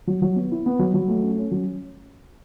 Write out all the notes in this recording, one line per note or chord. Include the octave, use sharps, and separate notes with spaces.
F#3
F#3
B3
E4
B3
F#3
F#3
A3
C#4
C#4
F#3